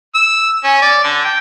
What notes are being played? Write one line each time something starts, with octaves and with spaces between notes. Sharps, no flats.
E6
C#4
D5
D3
G5